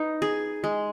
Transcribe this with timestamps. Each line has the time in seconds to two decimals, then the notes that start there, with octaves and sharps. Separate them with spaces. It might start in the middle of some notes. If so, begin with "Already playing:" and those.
Already playing: D#4 B4
0.22 G#4
0.64 G#3